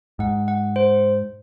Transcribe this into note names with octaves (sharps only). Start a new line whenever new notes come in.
G#2 F#5
F#5
C5